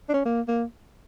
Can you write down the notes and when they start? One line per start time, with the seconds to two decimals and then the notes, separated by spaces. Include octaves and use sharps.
0.09 D4
0.14 C#4
0.25 A#3
0.48 A#3